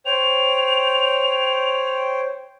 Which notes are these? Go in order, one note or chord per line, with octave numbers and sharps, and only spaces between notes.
C5 C#5 G5 F7